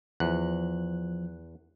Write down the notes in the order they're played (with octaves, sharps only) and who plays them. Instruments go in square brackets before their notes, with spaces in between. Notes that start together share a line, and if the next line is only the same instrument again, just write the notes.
[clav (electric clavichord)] E2 [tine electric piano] F3 F#6